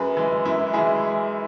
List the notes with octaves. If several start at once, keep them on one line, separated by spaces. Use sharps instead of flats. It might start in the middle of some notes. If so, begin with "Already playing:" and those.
Already playing: F#2 G#4 B4
E3 G#3
F#2 E4
E3 G#3 E4 G#4